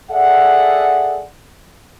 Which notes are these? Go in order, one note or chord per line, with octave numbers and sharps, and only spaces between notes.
G#4 A4 D5 E5 F#5